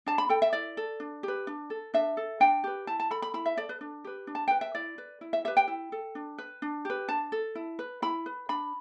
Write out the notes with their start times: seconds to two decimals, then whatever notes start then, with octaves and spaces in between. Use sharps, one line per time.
0.06 D4 A5
0.18 B5
0.29 A4 G5
0.42 E5
0.53 E4 D5
0.77 A4
1.00 D4
1.23 G4 B4
1.47 D4
1.70 A4
1.94 D4 E5
2.17 A4
2.40 D4 G5
2.64 G4 B4
2.87 E4 A5
3.00 A5
3.11 A4 B5
3.22 B5
3.34 E4 B5
3.46 E5
3.57 A4 D5
3.69 B4
3.81 D4
4.04 G4 B4
4.27 D4
4.35 A5
4.48 B4 G5
4.61 E5
4.75 E4 D5
4.98 B4
5.21 E4
5.33 E5
5.45 G4 B4 E5
5.57 G5
5.68 E4
5.92 A4
6.15 D4
6.38 B4
6.62 D4
6.85 G4 B4
7.08 D4 A5
7.32 A4
7.55 E4
7.79 B4
8.02 E4 B5
8.26 B4
8.49 D4 B5